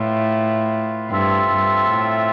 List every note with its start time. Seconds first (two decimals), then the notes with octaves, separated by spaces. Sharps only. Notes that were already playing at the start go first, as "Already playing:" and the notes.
Already playing: A2 F4 B4 F5
1.10 G2 C4 F4 A4 E5
1.50 G2
1.91 A2